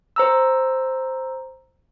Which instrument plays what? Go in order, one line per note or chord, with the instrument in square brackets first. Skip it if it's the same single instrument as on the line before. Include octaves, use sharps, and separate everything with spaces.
[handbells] C5 A#5 E6